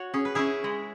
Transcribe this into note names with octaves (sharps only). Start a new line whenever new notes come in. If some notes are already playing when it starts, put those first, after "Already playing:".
Already playing: F#4 C#5
C#4 G#4
B4
C#4 E4 G#4
G#3